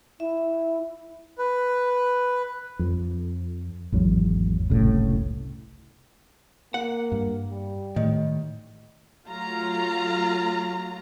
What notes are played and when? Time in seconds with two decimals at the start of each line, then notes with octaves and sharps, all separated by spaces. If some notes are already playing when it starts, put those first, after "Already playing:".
0.20 E4 E5
1.38 B4
2.79 F2
3.92 G#1 E2 F#3
4.70 F#1 C2 A2 C#3
6.74 A#3 F#5
7.12 G2
7.50 G3
7.96 A2 D#3
9.28 F#3 A3 F4 A#5